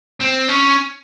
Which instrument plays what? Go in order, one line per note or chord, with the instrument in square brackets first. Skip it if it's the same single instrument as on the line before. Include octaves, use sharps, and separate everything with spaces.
[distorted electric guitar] C4
C#4